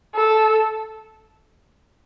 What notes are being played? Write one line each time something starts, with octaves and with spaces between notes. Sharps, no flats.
A4